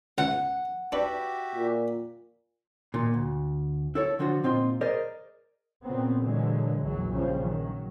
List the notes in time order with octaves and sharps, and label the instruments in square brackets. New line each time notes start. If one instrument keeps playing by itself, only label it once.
[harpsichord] C#2 [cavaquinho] F#5
[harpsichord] D4 B4 [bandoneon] F#4 G4 E5
[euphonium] A#2
[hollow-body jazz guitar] A#2 D#3
D2
E4 A4 C#5
D3 F3 D4 F4 F#4
A#2 C4 D#4 F4 C6
G#4 A#4 C5 D5 D#5
[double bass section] A#2 C#3 B3 C4
A#2 D3 E3 F#3 G#3
A#1 E2 E3 F#3
A#1 G2 C#3 F3 G3
D#3 F#3